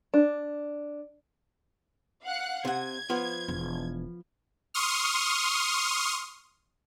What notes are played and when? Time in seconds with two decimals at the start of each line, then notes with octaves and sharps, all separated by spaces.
0.14 D4
2.26 F5 F#5 F#6
2.65 C3 F#5 G#6
3.10 F3 B3 F4
3.48 E1
4.74 C6 C#6 D#6 F6